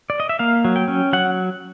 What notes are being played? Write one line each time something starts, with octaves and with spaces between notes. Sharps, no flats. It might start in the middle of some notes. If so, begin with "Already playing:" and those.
D5
D#5
E5
A#3 F5
F#3
G5
C#4
F#3 F#5